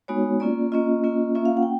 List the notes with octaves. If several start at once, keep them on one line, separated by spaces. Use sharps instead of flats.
G#3 B3 D#4 F#4 C#5
A#3 C#4 F4 D5
A#3 C#4 F4 D#5
A#3 C#4 F4
A#3 C#4 F4 E5
F5
F#5
G5